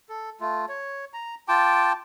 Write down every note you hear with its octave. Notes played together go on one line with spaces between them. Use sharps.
A4
A3 F4
C#5
A#5
F4 G5 A5 D6